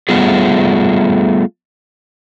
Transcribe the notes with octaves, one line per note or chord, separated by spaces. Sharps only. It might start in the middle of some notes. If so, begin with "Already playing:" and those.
G3 A3 B3 F4 G#4